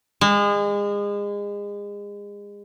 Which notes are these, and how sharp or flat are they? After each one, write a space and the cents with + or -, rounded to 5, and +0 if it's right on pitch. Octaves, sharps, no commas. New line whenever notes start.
G#3 -30